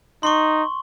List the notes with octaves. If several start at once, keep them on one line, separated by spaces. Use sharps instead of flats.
D#4 C6 C#6